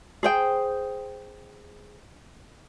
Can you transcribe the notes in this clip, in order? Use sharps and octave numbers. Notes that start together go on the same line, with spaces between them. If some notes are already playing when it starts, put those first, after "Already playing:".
G#4 C5 G5